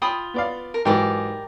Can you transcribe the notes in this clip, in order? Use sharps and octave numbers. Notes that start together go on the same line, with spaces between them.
F4 G5 B5 D#6
B3 D5 F5
A#4
G#2 E3 F#3 G4 A#4 D5